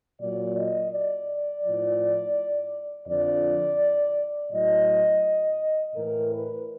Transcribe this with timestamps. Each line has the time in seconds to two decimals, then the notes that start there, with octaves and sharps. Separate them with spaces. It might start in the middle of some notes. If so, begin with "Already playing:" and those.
0.18 A#2 F#3 D5
0.55 D#5
0.91 D5
1.63 A2 F3
3.07 F2 D3 F3 D5
4.51 A2 F#3 D#5
5.95 A2 E3 A#4
6.32 B4